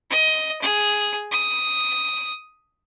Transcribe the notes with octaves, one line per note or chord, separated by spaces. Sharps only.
D#5
G#4
D#6